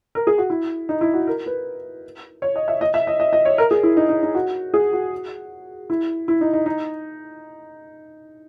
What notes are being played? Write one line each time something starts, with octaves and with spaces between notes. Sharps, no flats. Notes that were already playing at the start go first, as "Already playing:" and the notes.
A#4
G#4
F#4
E4
D#4
E4
F#4
A#4
B4
C#5
D#5
E5
D#5
E5
D#5
D#5
D#5
C#5
A#4
G#4
E4
D#4
D#4
D#4
F#4
G#4
F#4
E4
E4
D#4
D#4
D#4